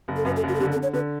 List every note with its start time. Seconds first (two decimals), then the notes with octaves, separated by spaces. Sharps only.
0.08 F#1
0.17 A4
0.25 F#2 B4
0.36 A4
0.43 F#1
0.49 F#4
0.55 A4
0.60 D3 G4
0.72 A4
0.76 D3
0.83 C#5
0.93 D3 B4